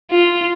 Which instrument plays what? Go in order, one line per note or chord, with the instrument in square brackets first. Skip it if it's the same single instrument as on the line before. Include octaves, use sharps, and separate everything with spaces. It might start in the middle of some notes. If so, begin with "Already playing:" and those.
[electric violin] F4